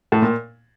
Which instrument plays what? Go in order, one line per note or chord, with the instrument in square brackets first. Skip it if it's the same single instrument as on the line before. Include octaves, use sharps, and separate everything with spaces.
[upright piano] A2
A#2